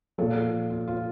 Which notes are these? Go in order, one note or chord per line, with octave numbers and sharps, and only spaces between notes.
A#2 F3 A4
F4
F4